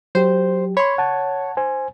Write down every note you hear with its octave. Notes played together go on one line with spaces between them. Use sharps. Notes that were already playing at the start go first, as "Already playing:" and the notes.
F#3 G4 C5
C#5 B5 C6
F#5 A5
C5 G#5